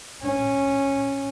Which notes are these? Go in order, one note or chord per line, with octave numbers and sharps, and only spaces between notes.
C#4